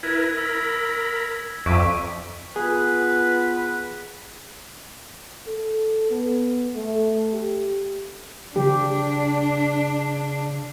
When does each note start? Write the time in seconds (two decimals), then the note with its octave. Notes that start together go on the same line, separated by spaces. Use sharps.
0.03 E4 A#4 B4 G#6
0.37 A#4 B5 E6
1.66 F2 E5 C#6 D6 B6
2.56 B3 F4 G#4 B4
5.47 A4
6.10 B3
6.75 A3
7.33 G4
8.56 C#3 D4 G4